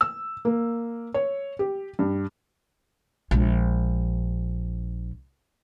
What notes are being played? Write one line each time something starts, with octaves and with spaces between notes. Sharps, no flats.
E6
A#3
C#5
G4
G2
A#1 G#3